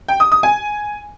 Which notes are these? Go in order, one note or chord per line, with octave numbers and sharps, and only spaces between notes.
G5
D#6
D#6
G#5